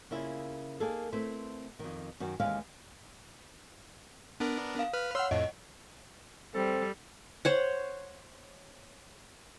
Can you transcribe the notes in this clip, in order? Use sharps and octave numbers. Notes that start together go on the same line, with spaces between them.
C#3 A#3 E4 F4
A#3 D#4 G#4 A4
A3 C4 E4 B4 C5
F2 D#3
F#2 D#3 F#4
D#2 E3 G#3 C#4 F5
B3 D4 A#4
F5
B4 F6
C#5 F#5 C6 E6 F6
F2 A2 D#5
G3 C4 A4
C5 C#5 F#5